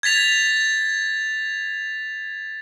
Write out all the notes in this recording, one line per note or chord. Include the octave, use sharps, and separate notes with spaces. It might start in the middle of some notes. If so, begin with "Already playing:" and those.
G#6 A6 B6 F7